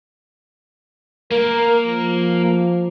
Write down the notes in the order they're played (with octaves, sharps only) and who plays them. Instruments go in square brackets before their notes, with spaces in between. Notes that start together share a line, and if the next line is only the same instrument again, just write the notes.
[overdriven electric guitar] A#3 [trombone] A#4
[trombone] F3